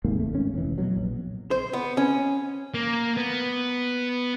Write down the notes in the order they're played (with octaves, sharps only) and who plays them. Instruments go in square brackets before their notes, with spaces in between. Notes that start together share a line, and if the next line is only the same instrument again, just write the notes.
[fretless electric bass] D#2 G#2 C3 A#3
A3
G#1 C#4
F1 E3
B2 D3 F#3
A#1
[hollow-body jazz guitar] C5
B3
C#4
[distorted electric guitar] A#3
B3